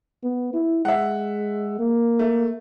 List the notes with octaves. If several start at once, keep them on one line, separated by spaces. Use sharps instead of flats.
B3
E4
G#3 E5 F#5
A#3
A3